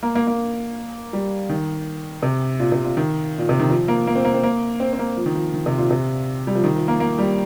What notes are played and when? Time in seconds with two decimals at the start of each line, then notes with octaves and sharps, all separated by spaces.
0.03 A#3
0.15 A#3
0.27 A#3
1.13 G3
1.49 D#3
2.23 C3
2.60 A#2
2.72 C3
2.84 A#2
2.97 D#3
3.38 A#2
3.49 C3
3.60 D#3
3.70 F3
3.88 A#3
4.07 A#3
4.15 C4
4.25 A#3
4.34 C4
4.43 A#3
4.80 C4
4.93 C4
4.99 A#3
5.17 F3
5.26 D#3
5.35 F3
5.54 D#3
5.66 C3
5.78 A#2
5.91 C3
6.47 G3
6.55 F3
6.64 D#3
6.76 F3
6.88 A#3
7.00 A#3
7.19 G3